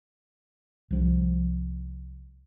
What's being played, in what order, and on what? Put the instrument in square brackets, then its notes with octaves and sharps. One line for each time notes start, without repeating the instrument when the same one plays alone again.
[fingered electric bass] C2 F3